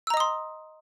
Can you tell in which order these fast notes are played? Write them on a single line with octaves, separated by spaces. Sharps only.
E6 A#5 D#5 D#6 C6